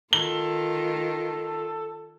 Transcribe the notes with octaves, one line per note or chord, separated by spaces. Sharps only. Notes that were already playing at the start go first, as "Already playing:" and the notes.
D#3 F4 A4 G7